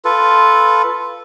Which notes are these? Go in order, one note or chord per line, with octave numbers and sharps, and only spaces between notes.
F4 A4 B4